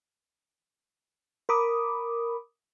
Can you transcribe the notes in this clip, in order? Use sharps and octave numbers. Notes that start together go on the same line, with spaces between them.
A#4 B5 D6 D#6